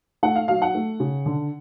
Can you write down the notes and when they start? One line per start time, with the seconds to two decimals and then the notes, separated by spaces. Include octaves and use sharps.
0.23 A3 F#5
0.36 F5
0.48 F#3 F5
0.62 F#5
0.74 A3
1.00 C#3
1.26 D3